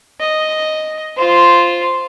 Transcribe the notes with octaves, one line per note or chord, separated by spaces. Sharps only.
D#5
F4 C5